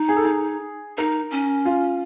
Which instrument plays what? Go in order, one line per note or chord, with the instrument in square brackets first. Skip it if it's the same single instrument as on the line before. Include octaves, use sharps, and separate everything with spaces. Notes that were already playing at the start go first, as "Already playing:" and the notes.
Already playing: [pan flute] D#4
[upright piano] G#4
A4
G#4
[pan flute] D#4 [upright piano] A#4
[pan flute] C#4
[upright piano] F4